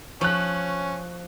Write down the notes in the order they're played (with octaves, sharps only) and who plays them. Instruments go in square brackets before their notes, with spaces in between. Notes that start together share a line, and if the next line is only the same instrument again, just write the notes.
[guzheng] F3 [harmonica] C#4 [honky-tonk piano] C#6 F#6